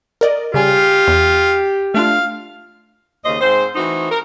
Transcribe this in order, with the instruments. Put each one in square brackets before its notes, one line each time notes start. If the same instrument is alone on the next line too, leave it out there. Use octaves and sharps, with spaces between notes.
[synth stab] A#4 D5 D#5
[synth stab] C#3 G3 G#5 [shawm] F4 [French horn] G4
[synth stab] E2
[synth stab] A3 D4 F4 [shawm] F5
[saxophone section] D#2 C#3 C5 D#5
G#2 C4 C5
E3 A3 C4 D#4 F#4
A#4